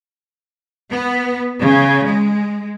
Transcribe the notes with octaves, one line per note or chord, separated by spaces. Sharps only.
B3
C#3
G#3